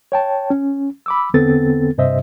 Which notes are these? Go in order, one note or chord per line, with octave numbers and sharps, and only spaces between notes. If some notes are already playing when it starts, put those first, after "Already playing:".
C#5 G5 A5
C#4
B5 D6 E6
E2 D3 B3 C4 A4 A6
G2 C3 C5 D#5 E5